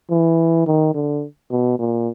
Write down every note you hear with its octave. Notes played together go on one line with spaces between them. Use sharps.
E3
D#3
D3
B2
A#2